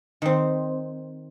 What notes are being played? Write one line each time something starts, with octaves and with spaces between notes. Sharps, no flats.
D#3 C4